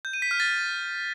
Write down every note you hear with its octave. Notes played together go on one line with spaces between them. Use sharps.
G6
D#7
B6
F6
A6